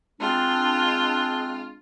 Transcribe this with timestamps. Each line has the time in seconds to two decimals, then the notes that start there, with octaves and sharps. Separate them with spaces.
0.20 G#3 C4 D4 F4